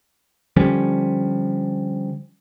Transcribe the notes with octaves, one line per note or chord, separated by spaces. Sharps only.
D3 F3 G3 C#4